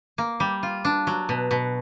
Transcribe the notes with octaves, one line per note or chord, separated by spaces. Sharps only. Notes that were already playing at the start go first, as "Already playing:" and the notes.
A#3
G3
F4
D4
F#3
B2
B2